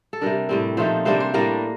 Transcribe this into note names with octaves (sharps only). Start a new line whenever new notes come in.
A4
C3 G3 D4 A#4
A2 G3 C4
A#2 F3 A3 D#4 C5
C3 G3 A#3 D4 C5
C5
A2 G3 A#3 D4 A#4